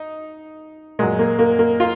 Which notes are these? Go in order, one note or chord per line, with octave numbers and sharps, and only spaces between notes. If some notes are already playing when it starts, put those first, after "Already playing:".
Already playing: D#4
A#2 F#3 G#3
A#3
A#3
A#3
F4